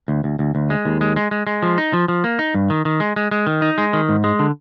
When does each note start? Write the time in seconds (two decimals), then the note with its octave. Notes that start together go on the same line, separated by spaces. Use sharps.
0.08 D2
0.24 D2
0.39 D2
0.55 D2
0.70 G#3
0.85 D#2
1.01 G#3
1.16 G#3
1.31 G#3
1.47 G#3
1.63 F3
1.78 D#4
1.93 F3
2.08 F3
2.24 A#3
2.39 D#4
2.54 G2
2.70 D#3
2.85 D#3
3.00 G#3
3.16 G#3
3.31 G#3
3.47 D#3
3.62 D#4
3.78 G#3
3.93 D#3
4.09 G#2
4.24 G#3
4.39 D3